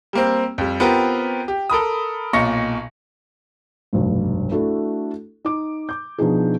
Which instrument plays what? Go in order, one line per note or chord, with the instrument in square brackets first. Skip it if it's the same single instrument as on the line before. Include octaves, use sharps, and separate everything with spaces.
[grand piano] G3 A#3 C4
F2 G3
B3 C4 F4 G4 A#4
G4
A4 A#4 B5 D#6
B1 A#2 D#5 C#6 A#6 C#7
[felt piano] F1 B1 G2
A3 D4 E4 F#4 A4
D#4 D6
D6 G6
B2 F3 D4 D#4 G#4